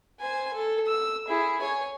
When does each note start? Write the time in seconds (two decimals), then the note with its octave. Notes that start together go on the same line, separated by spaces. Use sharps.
0.20 C5 G#5
0.54 A4
0.87 E6
1.28 E4 G#4
1.62 C#5 G#5